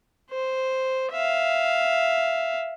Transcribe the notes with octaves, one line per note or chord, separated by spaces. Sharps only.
C5
E5 F5